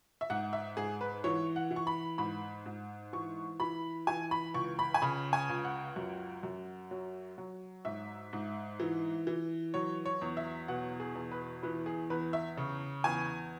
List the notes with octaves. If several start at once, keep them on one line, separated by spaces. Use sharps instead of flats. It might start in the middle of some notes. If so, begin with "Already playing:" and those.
E5
G#2 F#5
E5
G#2 G#4
B4
E3 C#5
F#5
E3
C#6
B5
G#2 B5
G#2
E3 C#6
E3 B5
E3 G#5
B5
C#2 C#6
B5
G#5
C#3 B5
G#5
C#2
F#5
F#2
F#2
F#3
F#3
G#2 E5
G#2
E3
E3
F#3 C#5
C#5
E2
E5
B2 F#5
G#4
E2
B4
E3 B4
G#4
E2 B4
E5
C#3
E2 G#5